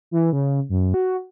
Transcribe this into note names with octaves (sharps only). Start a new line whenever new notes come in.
E3
C#3
F#2
F#4